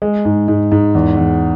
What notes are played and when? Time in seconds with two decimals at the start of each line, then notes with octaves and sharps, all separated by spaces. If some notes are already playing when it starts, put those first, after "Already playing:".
0.02 G#3
0.25 G#2
0.48 G#2
0.72 G#2
0.95 E2
1.17 E2